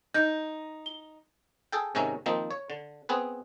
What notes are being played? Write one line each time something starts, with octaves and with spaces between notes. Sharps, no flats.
D#4 G6
G7
G#4 A4 G5
G#2 C3 D#3 C#4 E5 A#5
D#3 F3 A#3 C4 D#4
C#5
D3
B3 C4 G#4 B4